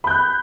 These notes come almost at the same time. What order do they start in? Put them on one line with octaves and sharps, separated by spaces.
B5 G6 F#6